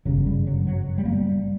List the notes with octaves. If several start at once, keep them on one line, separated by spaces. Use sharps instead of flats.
G1 F#2 C#3 F#3
G3
F#3
F#3
G3
A#3
G3